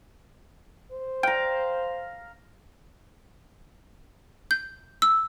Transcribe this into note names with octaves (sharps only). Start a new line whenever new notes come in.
C5
F5 G5 A#5
G6
E6